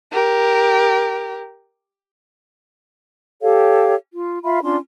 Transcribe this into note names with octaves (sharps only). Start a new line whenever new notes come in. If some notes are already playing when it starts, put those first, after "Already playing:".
G4 A#4
G4 A4 C#5 F5
F4
F4 E5 F5 B5
C#4 D4 F4 C6